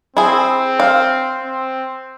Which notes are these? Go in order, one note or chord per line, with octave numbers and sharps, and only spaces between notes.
C4 E4 G#4
F5
C4